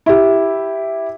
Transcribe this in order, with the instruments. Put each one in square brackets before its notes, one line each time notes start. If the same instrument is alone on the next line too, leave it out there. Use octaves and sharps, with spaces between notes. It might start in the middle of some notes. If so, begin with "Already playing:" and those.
[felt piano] E4 G4